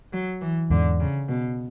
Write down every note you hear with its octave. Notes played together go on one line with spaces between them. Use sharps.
F#3
E3
E2 G#2 D3
C#3
B2